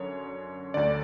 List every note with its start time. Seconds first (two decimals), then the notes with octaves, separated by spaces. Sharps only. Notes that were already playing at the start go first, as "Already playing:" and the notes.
Already playing: F#2 D3 C#5
0.74 D2 D3 D5